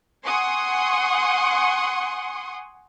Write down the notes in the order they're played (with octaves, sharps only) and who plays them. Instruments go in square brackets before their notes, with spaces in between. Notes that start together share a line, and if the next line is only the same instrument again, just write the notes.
[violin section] F#5 G#5 C6 C#6 D#6